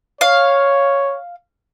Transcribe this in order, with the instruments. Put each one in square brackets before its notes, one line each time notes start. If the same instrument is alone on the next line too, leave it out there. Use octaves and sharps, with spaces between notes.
[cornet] C#5 [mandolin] F5